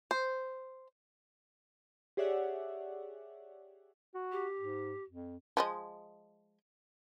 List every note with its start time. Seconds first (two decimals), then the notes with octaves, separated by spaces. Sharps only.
0.11 C5
2.17 G4 G#4 C#5 D5 E5 F#5
4.14 F#4
4.32 G4
4.59 G#2
5.10 F2
5.57 F3 G#3 D#5